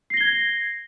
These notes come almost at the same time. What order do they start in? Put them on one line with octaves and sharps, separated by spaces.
C7 A#6 G7 G#6